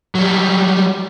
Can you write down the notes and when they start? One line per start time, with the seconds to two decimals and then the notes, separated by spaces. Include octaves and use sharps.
0.15 F#3 G3